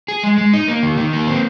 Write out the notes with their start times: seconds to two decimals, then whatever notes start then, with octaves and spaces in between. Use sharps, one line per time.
0.08 G#4
0.23 G#3
0.38 G#3
0.53 D#4
0.68 A#3
0.83 D#3
0.97 D#3
1.13 A#3
1.27 C4